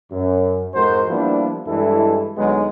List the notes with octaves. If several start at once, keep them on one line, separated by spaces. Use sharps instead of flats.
F#2
F2 G#2 G#3 F#4 A#4 C5
F3 G3 A#3 B3 D4 E4
G2 E3 G#3 E4 A4
D2 F#3 G#3 B3 D#4